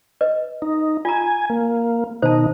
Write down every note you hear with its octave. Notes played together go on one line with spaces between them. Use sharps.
B4 D#5
D#4
F4 G#5 A#5
A#3
B2 D#3 D#4 C5 A5